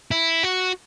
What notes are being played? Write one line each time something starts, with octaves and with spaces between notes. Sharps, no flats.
E4
F#4